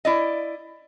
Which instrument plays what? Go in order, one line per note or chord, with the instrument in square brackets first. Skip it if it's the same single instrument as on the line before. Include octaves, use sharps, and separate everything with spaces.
[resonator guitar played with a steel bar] E4 D5 D#5